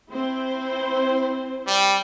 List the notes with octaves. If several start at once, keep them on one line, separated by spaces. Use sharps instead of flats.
C4 E4 C5
G3